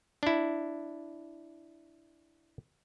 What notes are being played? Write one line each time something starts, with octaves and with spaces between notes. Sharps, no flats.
D4 E4